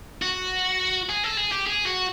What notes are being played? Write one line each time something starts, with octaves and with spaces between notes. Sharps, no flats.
F#4
G#4
A4
G#4
G4
G#4
F#4